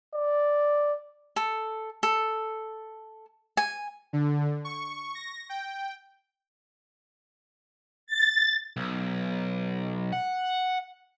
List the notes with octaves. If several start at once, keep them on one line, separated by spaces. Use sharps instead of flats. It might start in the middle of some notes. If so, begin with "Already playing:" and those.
D5
A4
A4
G#5
D3
C#6
A#6
G5
A6
B1
F#5